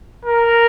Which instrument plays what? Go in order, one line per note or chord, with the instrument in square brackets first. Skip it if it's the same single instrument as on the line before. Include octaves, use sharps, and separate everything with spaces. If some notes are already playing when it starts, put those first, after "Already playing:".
[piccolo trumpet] A#4